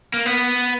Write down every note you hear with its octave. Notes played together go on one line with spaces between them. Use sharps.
A#3
B3